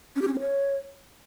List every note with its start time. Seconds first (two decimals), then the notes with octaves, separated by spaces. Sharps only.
0.16 C#4
0.22 G4
0.28 C#4
0.34 C4
0.39 C#5